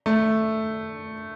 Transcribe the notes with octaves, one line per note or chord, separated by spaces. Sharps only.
A3